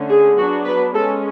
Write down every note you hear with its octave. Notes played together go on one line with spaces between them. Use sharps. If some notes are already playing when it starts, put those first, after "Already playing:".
Already playing: D3 A3 C#4
G#4
F#3 B3 D4 F#4
B4
G#3 C#4 A4